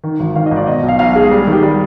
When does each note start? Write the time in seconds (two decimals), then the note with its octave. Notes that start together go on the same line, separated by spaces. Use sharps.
0.04 D#3
0.20 G#1
0.35 D#3 F5
0.46 D#5
0.51 G#1 D5
0.67 B2 D#5
0.78 D#5
0.83 B1
0.88 F5
0.99 B1 F5
1.15 G#3 G#4
1.31 G3 G4
1.42 G#4
1.47 D#3
1.52 G4
1.63 G3